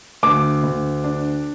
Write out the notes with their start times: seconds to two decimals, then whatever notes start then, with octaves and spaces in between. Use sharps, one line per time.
0.23 D2 D6
0.64 D2
1.04 D4